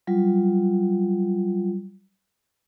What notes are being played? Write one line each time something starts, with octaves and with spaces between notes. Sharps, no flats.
F#3 G3 F4